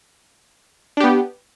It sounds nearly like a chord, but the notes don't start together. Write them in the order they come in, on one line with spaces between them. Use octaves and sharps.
D4 G4 B3